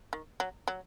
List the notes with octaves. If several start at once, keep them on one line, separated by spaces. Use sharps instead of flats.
D#3
F#3
F#3